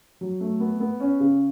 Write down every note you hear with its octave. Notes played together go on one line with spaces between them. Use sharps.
F#3
A3
B3
B3
C#4
C#3